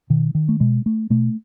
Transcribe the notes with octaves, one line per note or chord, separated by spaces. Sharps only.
B2 D#3
D#3
A3
B2 G#3
A3
B2 A3